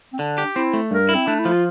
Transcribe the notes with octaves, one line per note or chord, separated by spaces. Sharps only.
C4
D3 D4
G4
C4 E4
A3
G2 A#4
E4
C4
A3 D4
E4
F3
F4